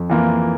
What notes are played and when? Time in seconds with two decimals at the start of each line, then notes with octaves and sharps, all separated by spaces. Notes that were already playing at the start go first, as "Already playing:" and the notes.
Already playing: F2
0.10 E3 A#3 F4